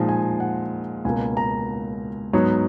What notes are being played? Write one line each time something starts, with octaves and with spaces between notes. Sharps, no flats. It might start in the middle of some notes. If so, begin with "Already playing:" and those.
Already playing: A#2 F3 G#3 D#4
G#5
F#5
C#2 B2 A#3 G#5
A#5
G#2 F#3 B3 D#4 C#5